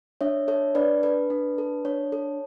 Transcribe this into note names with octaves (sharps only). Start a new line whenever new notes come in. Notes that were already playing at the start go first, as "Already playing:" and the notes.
D4 C#5 E5
A4 C#5 E5
D4 B4 D5
A4 B4
D4
A4
D4 C#5
A4